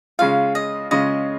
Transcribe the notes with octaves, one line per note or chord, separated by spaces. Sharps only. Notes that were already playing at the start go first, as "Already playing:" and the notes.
C#3 G#3 C#4 F4 F5
D#5
C#3 G#3 C#4 F4 D#5